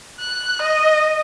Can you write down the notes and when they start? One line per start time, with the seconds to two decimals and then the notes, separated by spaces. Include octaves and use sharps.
0.19 F#6
0.62 D#5